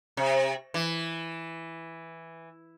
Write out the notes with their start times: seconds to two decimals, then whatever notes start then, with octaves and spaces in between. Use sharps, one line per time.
0.17 C3
0.74 E3